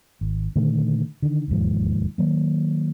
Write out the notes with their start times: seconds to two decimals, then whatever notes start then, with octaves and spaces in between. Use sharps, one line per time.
0.21 G#1
0.56 A#2 D3 D#3 A3
1.22 D3 D#3
1.48 E1 D#2 G#2 F3
2.18 D#3 F#3 A#3